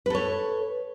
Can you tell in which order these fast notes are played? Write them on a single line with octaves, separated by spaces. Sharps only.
B4 A4 C#5